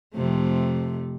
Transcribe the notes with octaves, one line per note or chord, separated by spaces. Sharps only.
F2 C3 A3